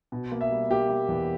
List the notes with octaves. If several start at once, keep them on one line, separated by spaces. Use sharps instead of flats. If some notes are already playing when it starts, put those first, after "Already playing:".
B2
A#3
E5
G3
A#3 G4
A#3
E2